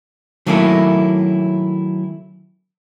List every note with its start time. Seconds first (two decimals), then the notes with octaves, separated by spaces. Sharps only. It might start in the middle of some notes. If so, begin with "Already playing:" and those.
0.46 D#3 F#3 A3 A#3 C#4 E4